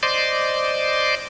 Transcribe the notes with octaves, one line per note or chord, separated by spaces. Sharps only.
C5 D5 D#5 C6 D6